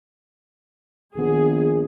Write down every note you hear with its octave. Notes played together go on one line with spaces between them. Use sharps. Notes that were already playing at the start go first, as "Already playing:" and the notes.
A#1 D#3 B3 G#4